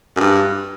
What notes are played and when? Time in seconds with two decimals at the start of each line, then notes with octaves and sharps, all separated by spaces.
0.17 F#2
0.20 G2